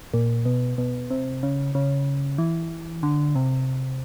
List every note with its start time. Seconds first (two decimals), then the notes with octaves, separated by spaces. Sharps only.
0.14 A#2
0.45 B2
0.78 B2
1.10 C3
1.43 C#3
1.75 C#3
2.38 E3
3.03 D3
3.35 C3